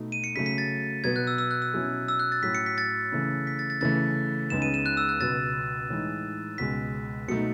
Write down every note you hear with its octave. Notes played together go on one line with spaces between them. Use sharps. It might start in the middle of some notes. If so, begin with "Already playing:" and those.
Already playing: B2 A3 D#4
D#7
C#7
C#3 F#3 A3 B6
B6
A6
B2 F#3 B3 G#6
F#6
E6
E6
F#6
E6
B2 F#3 C#4 E4
E6
F#6
A6
A2 F#3 C#4 B6
C#7
B6
A6
C#3 E3 A3
B6
A6
A6
C#3 E3 A3 A6
C#2 C#3 G#3 B3 D#4 E7
D#7
E7
F#6
E6
F#6
C#2 B2 F#3 B3 A6
A2 E3 G#3 D#4
C#2 B2 G#3 B6
B2 F#3 A3 D#4 C#7